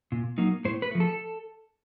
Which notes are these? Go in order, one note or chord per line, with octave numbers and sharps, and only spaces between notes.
A#2
F#3 A#3 D#4
A2 C5
B4
F3 A3
A4